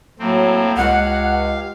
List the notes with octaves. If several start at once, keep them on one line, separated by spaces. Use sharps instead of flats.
A2 F#3 A#3 C4
C#2 G4 F5 F#5